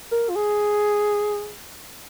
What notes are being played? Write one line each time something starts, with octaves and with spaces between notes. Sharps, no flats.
A#4
F4
G#4